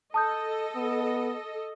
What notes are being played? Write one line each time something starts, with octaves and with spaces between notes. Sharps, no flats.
A4 D#5 A5 D#6 G6
B3